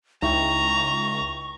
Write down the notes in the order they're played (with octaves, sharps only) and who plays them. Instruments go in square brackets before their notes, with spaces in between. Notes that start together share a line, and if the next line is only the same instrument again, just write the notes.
[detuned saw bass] C#2 [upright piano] D#4 E4 G5 [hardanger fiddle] A#5 [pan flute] C#6